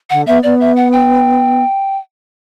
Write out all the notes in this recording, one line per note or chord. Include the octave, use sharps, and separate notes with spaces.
D3 F#5
B3 E5
B3 D5
E5
F#5
G5